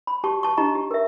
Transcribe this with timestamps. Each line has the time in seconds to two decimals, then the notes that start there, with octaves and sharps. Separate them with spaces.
0.07 B5
0.24 F#4 G4 A5 C#6
0.43 A5 C#6
0.57 D4 D#4 G4 D#5 A#5 C#6
0.75 G4
0.91 A#4 E5